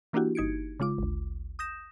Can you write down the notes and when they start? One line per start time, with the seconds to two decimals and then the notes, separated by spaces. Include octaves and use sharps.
0.13 E3 A#3 D4 E4 F#4 G4
0.35 G1 D#4 G#6 C#7 D7
0.80 C#3 G#3 F4 D6
0.98 G#1 D2
1.59 D#6 G6 A#6 E7